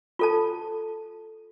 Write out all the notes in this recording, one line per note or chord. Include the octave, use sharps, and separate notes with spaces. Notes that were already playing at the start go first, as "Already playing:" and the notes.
F4 A4 A5